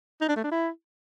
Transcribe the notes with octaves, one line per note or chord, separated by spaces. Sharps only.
D#4
D4
A3
D4
E4